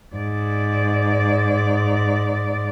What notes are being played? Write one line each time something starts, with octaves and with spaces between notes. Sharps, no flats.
G#2 D5